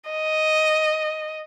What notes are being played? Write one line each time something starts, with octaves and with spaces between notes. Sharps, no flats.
D#5